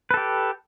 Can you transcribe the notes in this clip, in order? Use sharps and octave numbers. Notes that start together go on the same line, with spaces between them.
G4 A4 B4